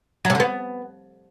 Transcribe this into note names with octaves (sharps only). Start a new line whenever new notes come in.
F#3
C3
D3
B3